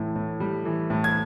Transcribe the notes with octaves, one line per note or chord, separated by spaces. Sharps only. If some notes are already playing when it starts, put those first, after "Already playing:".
Already playing: A2 E3
A2
G3
E3
A2
G#6